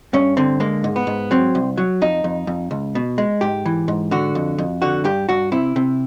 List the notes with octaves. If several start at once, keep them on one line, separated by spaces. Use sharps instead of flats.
G2 C#4
D3 C4
G#3 A#3
G#2
B3
G#2
F#3 C4
C2
F#3
F2 D#4
F2
F2
C#2
B2
G#3
G#2 G4
E3
G#2
D3 F#4
F2
F2
D3 F#4
G2 G4
G2 F#4
C3 E4
C3